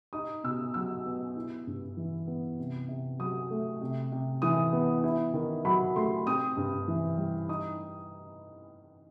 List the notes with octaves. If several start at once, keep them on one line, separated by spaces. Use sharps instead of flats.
D#4 D#6
B2 E6
F#3 E6
B3
E4
G2
E3
B3
C3
C3
F#3 D#6
A3
C3
C3
E3 D#6
B3
E4
D#3
F#3 B5
A3 C6
C4 D#6
G2
E3
G3
D#4 D#6